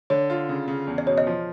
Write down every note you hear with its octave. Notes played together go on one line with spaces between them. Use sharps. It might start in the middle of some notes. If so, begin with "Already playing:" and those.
D3 C#5
F4
C#3
C#3
E2
D5
B2 C#5
D#5
F3